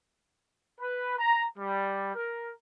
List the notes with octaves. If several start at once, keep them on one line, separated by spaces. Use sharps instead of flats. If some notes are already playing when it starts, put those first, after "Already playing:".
B4
A#5
G3
A#4